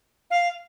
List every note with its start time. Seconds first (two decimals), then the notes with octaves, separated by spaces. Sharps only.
0.31 F5